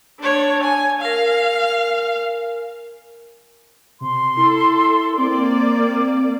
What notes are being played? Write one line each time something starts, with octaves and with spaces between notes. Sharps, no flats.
D4 C#5
G#5
A#4 F5 G#5
C3 C6
E4 A4
A#3 C4 D5